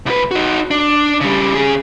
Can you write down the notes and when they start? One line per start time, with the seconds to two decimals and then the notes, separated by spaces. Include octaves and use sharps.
0.06 C2 B4
0.31 D#4 F#4
0.71 D4
1.21 C#3 G3
1.54 C#3 G#4